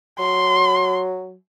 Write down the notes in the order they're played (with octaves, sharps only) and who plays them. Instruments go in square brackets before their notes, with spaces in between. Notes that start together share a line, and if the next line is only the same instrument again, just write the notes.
[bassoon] F#3 [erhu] C6